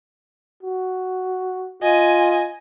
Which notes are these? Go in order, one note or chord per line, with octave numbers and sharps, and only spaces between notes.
F#4
F4 D#5 G#5